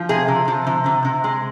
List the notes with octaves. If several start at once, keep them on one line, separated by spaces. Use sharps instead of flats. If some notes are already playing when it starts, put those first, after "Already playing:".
Already playing: F3
C3 G#4
C3
F3
C3
C3
C3
G#3